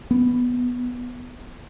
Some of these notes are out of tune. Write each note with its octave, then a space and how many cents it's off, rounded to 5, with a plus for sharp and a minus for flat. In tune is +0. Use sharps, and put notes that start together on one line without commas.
B3 -5